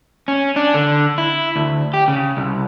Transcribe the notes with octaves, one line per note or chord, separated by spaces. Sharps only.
C#4
D4
D3
E4
D2
G4
C#3
C2